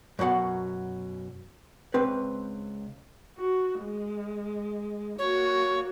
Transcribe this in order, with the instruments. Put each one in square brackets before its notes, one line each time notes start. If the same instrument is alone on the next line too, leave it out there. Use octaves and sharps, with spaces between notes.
[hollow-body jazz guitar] F#2 B2 F#3 F#5
C#2 C4 B4
[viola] F#4
G#3
[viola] A#3 F#4 [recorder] C#5